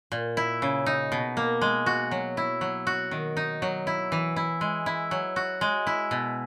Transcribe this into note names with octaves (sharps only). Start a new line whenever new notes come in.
A#2
E4
C#3
D#4
B2
A#3
G#3
F#4
F#3
E4
F#3
F#4
D#3
D#4
F#3
E4
E3
E4
G#3
E4
F#3
F#4
G#3
E4
B2